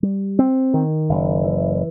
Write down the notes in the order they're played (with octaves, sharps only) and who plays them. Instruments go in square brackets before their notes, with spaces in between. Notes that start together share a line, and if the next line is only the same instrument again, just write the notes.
[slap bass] G3
C4
D#3
F#1
E3